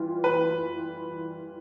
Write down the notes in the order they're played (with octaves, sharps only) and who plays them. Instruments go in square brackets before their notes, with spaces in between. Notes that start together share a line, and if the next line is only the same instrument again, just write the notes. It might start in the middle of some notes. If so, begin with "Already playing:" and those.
Already playing: [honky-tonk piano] E3 G3 F4
[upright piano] B4